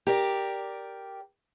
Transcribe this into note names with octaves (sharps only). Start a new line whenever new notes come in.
G4 A#4 D5